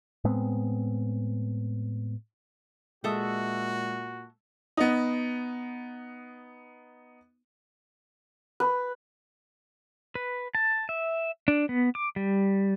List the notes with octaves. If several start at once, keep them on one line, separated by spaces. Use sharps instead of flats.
A2 G#3 B3 C4
A#2 G#3 F#4 A4 E5 D#6
B3 D#4
B4
B4
A5
E5
D4
B3
D6
G3